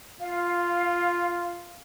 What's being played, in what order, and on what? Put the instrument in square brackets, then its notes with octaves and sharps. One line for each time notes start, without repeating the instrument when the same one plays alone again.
[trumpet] F4 [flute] F5